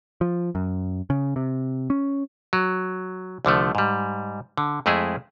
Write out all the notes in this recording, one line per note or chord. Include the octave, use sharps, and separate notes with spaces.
F3
F#2
C#3
C3
C#4
F#3
C2 D3 F3 A3
G#2 G3
D3
F2 G#3 A3 E4 G#4